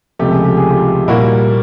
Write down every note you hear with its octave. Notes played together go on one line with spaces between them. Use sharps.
C#2 C3 F3 A3 G4
G#4
G4
G#4
F4 G4
A#2 G3 A#3 E4 F#4